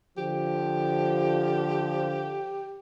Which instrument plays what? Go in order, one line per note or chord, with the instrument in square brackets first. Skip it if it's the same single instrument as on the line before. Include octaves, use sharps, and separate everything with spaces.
[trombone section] D3 F3 [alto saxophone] G4